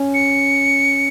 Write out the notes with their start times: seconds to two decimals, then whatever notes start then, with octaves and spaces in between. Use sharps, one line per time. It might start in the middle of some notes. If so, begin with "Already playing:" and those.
Already playing: C#4
0.14 C#7